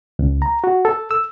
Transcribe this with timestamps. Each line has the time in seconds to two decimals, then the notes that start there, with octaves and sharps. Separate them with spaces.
0.19 C#2
0.42 A#5
0.64 F#4
0.85 A4
1.11 E6